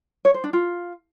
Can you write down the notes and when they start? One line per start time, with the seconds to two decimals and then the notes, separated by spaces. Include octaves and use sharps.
0.25 C#5
0.34 C5
0.44 D4
0.53 F4